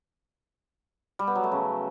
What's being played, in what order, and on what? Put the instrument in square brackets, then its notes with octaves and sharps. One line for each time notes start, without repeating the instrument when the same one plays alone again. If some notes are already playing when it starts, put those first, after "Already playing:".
[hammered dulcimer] G3
B3
F#3
A3
C#3